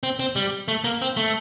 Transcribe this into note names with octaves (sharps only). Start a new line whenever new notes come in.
C4
C4
G3
A3
A#3
C4
A3